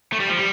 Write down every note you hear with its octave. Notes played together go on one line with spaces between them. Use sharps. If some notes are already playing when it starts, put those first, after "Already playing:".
A3
G3
F3
G3